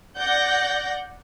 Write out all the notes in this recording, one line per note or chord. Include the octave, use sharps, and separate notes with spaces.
D5 F#5 G6 A#6